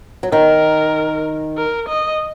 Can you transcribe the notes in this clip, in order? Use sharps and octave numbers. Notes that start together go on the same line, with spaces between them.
F#3
D#3 A#4
A#4
D#5